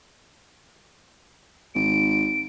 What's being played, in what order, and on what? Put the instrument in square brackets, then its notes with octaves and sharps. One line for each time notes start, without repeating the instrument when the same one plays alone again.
[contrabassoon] G#1 [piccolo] D7